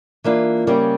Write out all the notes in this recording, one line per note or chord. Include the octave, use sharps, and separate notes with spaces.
E3 A#3 D4 F4
C#3 G3 A#3 C#4 G4